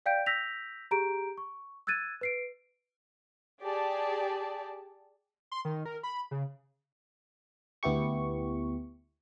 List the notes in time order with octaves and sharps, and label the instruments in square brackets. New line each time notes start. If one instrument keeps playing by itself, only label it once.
[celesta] D5 F5 G5 G6 D7
E6 G6 A#6 B6 F7
G4 G#4 A#5 G6 D7
C#6
E6 F#6 G#6 A6 D#7
B4 C7 D7
[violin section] G4 G#4 D5 A5
[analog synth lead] C6
D#3
A#4
B5
C#3
[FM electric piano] D2 B3 E4 G4 C#6